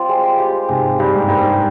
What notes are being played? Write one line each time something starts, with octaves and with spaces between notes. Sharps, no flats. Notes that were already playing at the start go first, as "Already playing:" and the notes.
Already playing: G3 C4 F4
G#3
G4
G#2 C3 G#3
G2 G4
G#2
G2 A#4
G#2